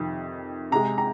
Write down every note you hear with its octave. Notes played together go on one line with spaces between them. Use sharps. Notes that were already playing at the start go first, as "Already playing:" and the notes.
Already playing: F2 C3 D#3
C3 G#3 A#5
A#5